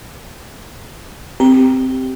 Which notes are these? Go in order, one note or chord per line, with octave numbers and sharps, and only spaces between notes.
C4 G4